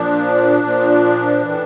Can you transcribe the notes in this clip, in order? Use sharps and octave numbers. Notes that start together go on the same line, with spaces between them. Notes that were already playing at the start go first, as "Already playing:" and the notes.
Already playing: A#2 F3 D4
A#2 F3
A2 E3